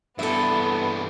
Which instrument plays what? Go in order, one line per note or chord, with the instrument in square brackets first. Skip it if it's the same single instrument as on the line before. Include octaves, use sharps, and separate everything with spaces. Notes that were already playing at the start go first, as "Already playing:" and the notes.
[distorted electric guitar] G2 E3 [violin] B3 [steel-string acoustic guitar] A4 E5